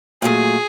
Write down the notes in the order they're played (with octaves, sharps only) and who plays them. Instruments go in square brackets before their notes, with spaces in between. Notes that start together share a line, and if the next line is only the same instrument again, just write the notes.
[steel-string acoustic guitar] A#2 F#3 A3 [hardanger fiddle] G#4